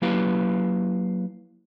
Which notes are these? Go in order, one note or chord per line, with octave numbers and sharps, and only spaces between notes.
F#3 A#3 E4 G4 B4 F5